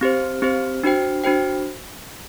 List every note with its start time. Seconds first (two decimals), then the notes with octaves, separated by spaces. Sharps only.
0.01 C4 G4 C5
0.42 C4 G4 C5
0.84 D4 F#4 C5 G5
1.24 D4 F#4 C5 G5